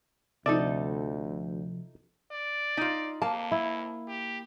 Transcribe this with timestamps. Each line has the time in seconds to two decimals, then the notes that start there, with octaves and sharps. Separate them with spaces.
0.46 D2 C3 F3 D#4 A4 D5 E5
2.31 D5
2.77 D#4 F4
3.22 F2 A#3 A5
3.52 E4
4.08 G4